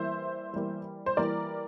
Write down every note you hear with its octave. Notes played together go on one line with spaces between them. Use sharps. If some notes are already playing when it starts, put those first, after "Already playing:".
Already playing: E3 G3 A#3 C5 E5
E3 G3 A#3
C5
E3 G3 A#3 A#4 D5